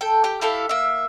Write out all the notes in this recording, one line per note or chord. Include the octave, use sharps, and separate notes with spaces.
A4 G5
G4 G5
E4 G4 A4 F5
A#3 E5